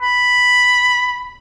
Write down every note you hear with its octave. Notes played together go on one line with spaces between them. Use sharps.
B5